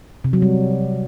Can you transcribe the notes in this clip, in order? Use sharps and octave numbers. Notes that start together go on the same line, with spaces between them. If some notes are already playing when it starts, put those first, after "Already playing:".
C3
F#3
G3